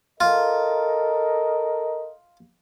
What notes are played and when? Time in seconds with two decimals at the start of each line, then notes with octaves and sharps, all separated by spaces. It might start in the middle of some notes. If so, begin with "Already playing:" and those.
0.20 F4 A4 A#4 D#5